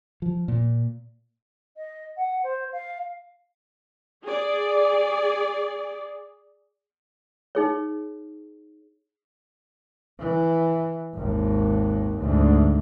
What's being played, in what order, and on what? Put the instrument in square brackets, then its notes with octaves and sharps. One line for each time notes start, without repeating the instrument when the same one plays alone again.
[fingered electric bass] F3
A#2
[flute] D#5
F#5
C5
F5
[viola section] G#4 D5
[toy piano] D#4 G#4 C#5
[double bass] E3
G#1 D#2
D2 G#2